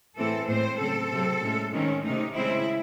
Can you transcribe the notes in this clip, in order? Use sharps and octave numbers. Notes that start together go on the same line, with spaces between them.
A2 E3 C4 A4
A2 G#3 C4 C5
C#3 F#3 C4 A4
C3 F#3 C4
A2 G#3 C#4
D#3 G#3 C4 C#4
C3 D#3 A3 D#4
C#3 G#3 C4 E4